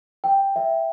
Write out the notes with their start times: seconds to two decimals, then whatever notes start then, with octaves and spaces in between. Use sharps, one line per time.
0.24 G5
0.56 E5